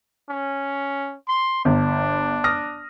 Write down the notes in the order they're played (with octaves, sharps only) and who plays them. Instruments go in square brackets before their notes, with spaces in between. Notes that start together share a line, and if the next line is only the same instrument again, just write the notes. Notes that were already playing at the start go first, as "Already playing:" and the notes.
[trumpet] C#4
C6
[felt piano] G1 [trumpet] D4
[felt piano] D#6 F6 A#6